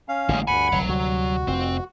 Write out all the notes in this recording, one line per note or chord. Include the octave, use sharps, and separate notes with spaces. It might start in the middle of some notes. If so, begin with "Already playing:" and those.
C#4 F5
A1 D3 G#3 A#3
D2 G2 F#5 G#5 B5
G1 C2 F#2 F#3
D2 C3 G3 F#4
F1 F2 F3 C4